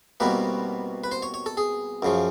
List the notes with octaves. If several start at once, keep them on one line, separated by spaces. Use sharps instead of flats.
C2 B2 G3 A#3 B4
B4
C5
C#5
C#5
A4
G#4
F#2 C#3 F3